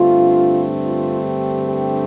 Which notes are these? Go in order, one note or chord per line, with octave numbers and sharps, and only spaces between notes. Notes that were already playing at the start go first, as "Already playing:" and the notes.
Already playing: G2 D3 A3 C4 F4
F4
G4
G4